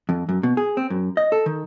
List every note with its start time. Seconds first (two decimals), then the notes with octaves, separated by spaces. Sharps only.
0.09 F2
0.29 F#2
0.43 B2
0.57 G#4
0.77 C4
0.90 F#2
1.17 D#5
1.32 A4
1.46 D#3